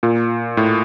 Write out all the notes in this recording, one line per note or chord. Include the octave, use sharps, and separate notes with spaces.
A#2
A2